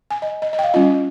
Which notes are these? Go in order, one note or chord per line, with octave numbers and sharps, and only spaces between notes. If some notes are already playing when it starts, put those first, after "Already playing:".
G#5
D#5
D#5
D#5
G5
F5
G3 C#4 F4 D#5